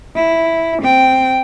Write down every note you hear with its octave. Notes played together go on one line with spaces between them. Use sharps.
E4
C4 G5